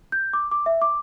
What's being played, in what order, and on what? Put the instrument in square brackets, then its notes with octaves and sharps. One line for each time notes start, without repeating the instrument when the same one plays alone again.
[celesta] G6
D6
D6
E5
D6